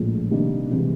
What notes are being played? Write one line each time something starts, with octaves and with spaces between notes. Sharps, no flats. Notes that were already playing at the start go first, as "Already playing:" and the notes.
Already playing: A#1 A2 F3 G#3
C3 D#3 G3 A#3 D4
C3 E3 G#3